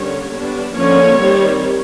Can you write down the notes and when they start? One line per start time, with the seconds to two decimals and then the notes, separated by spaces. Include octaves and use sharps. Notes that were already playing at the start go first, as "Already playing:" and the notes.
Already playing: D3 G3 A#3 C#4 C#5
0.35 G3 B3 D4
0.77 D3 F3 A#3 C#4 C#5
1.20 D#3 G3 C4